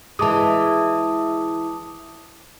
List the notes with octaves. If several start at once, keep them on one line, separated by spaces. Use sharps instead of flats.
E3 G#3 A5 D6 D#6